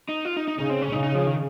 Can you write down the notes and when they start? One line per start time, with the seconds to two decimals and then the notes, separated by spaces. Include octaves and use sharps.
0.09 D#4
0.25 F4
0.37 D#4
0.48 D#4
0.59 C#3 D#4
0.70 C4
0.82 C#4
0.92 C#3 D#4
1.03 D#4
1.15 F3
1.26 D#3